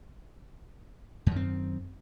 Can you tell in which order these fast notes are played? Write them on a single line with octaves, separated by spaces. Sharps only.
F#2 D#3 C4